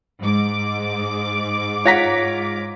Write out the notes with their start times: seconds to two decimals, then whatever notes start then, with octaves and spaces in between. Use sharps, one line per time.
0.19 G#2 D6
1.85 F4 C#5 F#5 A#5 A#6 B6